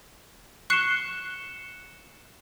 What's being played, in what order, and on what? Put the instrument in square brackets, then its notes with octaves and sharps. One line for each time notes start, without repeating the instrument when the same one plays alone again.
[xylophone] C#6 F#6 C7 [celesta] C#7 E7 G7